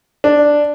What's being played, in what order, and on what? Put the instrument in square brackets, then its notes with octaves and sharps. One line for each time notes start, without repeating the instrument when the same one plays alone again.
[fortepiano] D4